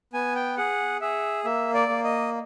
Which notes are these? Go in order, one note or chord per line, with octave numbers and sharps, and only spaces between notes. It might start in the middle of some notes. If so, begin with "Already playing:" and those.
B3 G#5
G5
G#4 F#5
G#4 E5
A#3 E5
D5
A#3
D#5